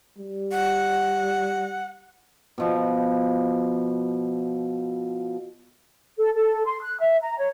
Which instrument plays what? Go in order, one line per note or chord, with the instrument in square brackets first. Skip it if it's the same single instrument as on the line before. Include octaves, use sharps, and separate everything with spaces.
[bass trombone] G3
[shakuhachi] F#5
[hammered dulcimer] B2 F3
[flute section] A4
A4
C6
F#6
E5
A#5
C#5